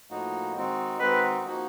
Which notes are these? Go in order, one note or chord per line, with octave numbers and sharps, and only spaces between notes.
A2 F3 A#3 D#4 F#4
D#3 G#3 C4 D#4 F#4
D#3 G#3 C4 D#4 F#4 B4
F3 A#3 D#4 F#4